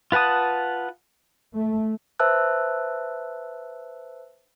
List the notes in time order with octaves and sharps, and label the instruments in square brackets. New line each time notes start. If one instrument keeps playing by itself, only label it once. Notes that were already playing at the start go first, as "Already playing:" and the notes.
[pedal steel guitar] F4 B4 F#5 A5 D#6
[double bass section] A3
[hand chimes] B4 C5 E5 A5 E6 F#6